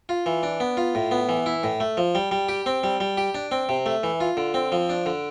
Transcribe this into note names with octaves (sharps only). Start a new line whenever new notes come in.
F4
E3
D4
B3
F4
A2
B3
E3
E4
A2
A3
F3
G3
G3
G4
C4
G3
G3
G4
D4
C4
C3
A3
E3
F4
D3
C4
F3
D4
D3